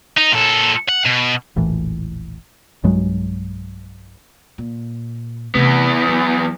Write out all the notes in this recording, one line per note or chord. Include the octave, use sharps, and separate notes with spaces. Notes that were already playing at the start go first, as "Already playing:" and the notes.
D#4
A#2 A4
F#5
B2
E1 A#1 A2 E3
B1 G2 F#3 G#3
A#2
E2 C3 A3 B3
F#3